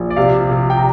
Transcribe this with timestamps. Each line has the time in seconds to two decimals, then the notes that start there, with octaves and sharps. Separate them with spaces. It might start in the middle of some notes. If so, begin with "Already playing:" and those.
Already playing: A#1
0.10 D5
0.16 C3 F5
0.51 C3
0.70 G5
0.78 A#5